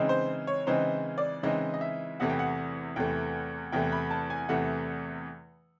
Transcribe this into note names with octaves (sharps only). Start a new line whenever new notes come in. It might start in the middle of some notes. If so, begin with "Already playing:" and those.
Already playing: C#3 E3 G#3 C4 D#4
C5
C#5
C#3 E3 G#3 C4 D#4 C5
D5
C#3 E3 G#3 C4 D#4 D#5
D#5
E5
E2 C3 E3 A3 F#5
G5
F#5
E2 C3 E3 A3 G5
E2 C3 E3 A3 G5
B5
A5
G#5
E2 C3 E3 A3 F#5